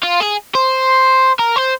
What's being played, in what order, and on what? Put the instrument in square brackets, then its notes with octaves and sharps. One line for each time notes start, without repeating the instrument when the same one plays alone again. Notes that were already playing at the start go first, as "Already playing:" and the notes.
[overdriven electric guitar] F4
G#4
C5
A#4
C5